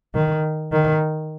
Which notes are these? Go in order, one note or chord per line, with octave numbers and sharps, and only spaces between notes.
D#3
D#3